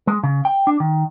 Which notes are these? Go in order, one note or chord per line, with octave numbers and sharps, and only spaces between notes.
G#3
C#3
G5
D4
D#3